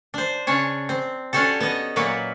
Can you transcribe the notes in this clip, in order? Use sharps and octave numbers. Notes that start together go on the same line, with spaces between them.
D4 C5
C#3 C#4 D4 C#5
C4
C#4 D4 F#4 G4 A4
B3 D#5
A#2 F#3 A#3 F#4 B4